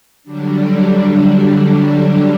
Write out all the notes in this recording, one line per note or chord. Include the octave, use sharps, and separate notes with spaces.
D3 F#3 G3 D4